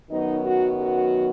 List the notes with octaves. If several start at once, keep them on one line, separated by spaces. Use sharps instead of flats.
F#2 D#3 F#3 B3 D#4
F#4
F#4